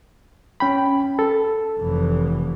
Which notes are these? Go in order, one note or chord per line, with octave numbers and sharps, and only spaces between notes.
C#4 G5 B5
A4
F1 E3